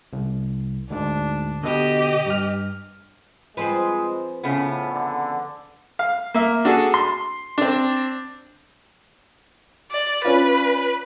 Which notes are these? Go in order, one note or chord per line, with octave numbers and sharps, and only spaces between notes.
C2
D2 G#2 D4
B2 D3 G4 D#5
G2 F6
F3 G#3 C4 B4 C5
A2 C#3 B3
D3
F5
A#3 E5
D4 F#4 G#4 A4
C6
C4 D4
D5
C#4 D4 F4 B4